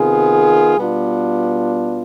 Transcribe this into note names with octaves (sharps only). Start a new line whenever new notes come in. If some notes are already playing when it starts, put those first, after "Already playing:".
Already playing: C3 D#3 B3 F4 G#4
B2 G3 B3 D4 F4